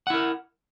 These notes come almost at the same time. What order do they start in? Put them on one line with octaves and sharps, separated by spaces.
F#5 E4 A#4